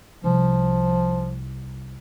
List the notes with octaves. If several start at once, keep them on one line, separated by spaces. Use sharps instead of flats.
C2 F3